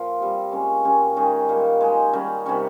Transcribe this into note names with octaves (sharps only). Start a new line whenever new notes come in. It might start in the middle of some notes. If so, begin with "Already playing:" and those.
Already playing: A#2 F3 F4
G3 C4 G4
A#2 G#3 C#4
A#2 G#3 C#4 G4
D#3 G#3 C#4 G#4
A#2 G3 A#3
G#3 D#4 G#4
D#3 G3 C#4
C3 D#3 G3 C#4